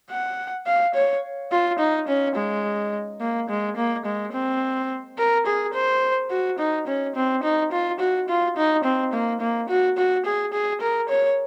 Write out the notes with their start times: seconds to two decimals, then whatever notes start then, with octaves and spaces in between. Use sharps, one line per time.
0.11 F#5
0.66 F5
0.94 C#5
1.52 F4
1.79 D#4
2.08 C#4
2.36 G#3
3.20 A#3
3.49 G#3
3.77 A#3
4.05 G#3
4.33 C4
5.18 A#4
5.46 G#4
5.73 C5
6.30 F#4
6.59 D#4
6.87 C#4
7.15 C4
7.43 D#4
7.71 F4
8.00 F#4
8.28 F4
8.56 D#4
8.84 C4
9.13 A#3
9.41 A#3
9.69 F#4
9.97 F#4
10.25 G#4
10.53 G#4
10.81 A#4
11.09 C#5